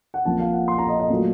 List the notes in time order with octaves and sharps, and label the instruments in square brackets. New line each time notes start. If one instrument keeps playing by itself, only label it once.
[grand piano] F#5
A#1 A#2 F3 C4 A5
F5
F#5
C6
A#5
D#5
D#5
A#2 F#3 A3